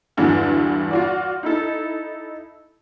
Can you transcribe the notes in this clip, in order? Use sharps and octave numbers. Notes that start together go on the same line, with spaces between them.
E2 G2 D3 E3 F#3
F4 F#4 D5
D#4 E4 A4